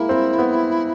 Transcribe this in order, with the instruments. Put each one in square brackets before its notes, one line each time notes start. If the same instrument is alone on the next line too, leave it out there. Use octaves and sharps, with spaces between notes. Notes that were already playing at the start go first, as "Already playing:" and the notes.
Already playing: [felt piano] G#3 A#3 [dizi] E4
[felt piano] C4
B3